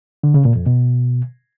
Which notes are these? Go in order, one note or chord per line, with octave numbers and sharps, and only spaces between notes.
D3
C#3
A#2
F2
B2